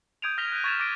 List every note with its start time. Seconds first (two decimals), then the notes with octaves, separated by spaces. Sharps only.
0.22 D#6 G6 G#6 D7 D#7 F7
0.38 F6 A#6 B6 F7 G7
0.52 F#6 D#7
0.64 C#6 G#6 A6 B6 E7 F7
0.80 D6 A6 A#6 D7